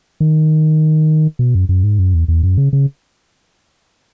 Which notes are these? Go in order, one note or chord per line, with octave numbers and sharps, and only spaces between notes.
D#3
B2
F#2
F#2
G#2
F#2
E2
E2
F#2
C#3
C#3